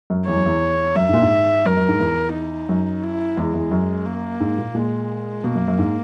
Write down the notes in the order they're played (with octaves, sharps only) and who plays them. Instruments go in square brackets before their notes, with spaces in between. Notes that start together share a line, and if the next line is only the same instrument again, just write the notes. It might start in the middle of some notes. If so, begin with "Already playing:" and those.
[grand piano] F#2
[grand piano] E2 [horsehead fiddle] C#5
[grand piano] F#2
E2
[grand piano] F#2 [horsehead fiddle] E5
[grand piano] G#2
A#2
G#2
[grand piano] F#2 [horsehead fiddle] A#4
[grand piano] F#2
G#2
E2
[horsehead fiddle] D#4
[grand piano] F#2
[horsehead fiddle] E4
[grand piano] E2 [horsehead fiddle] G#3
[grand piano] E2
F#2
[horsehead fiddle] A#3
[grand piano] G#2
A#2
[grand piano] A#2 [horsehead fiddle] G#3
[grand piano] B2 [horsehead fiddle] A#3
[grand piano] F#2
F#2
G#2